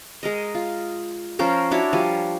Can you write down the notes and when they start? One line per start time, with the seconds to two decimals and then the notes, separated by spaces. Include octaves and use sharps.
0.23 G#3 A#4 D#5
0.55 F4
1.39 F3 C#4 A#4 C5
1.71 D4 E4 F#4 C#5
1.93 F3 G3 G#5